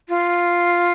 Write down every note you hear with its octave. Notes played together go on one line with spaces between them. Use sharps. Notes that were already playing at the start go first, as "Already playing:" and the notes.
F4